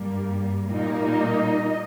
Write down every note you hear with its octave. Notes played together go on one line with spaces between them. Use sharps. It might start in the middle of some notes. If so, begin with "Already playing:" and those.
Already playing: G2 G3 A#3
A#2 G3 A#3 D#4
D#5